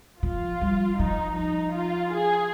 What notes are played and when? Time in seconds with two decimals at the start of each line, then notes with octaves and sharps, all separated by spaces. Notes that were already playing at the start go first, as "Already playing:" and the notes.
0.22 F3 F4
0.61 G3
0.99 F3 D#4
1.37 D#4
1.75 F4
2.14 G#4